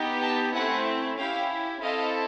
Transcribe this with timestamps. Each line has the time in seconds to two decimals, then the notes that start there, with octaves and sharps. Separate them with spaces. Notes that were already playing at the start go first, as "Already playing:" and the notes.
Already playing: B3 D#4 G4
0.22 G5 A5
0.54 A3 C4 E4 F#5 G#5
1.18 C#4 E4 G4 F5 G5
1.81 C4 E4 A4 D#5 F5